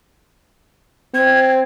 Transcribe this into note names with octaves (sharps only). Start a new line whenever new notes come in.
C4 G#6